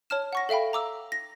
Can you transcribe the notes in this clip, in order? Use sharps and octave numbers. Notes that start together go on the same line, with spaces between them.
C#5 A5 F6 E7
F#5 C#6 A#6
A4 E5 F5 G5 B5
A#5 D6 E6
A#6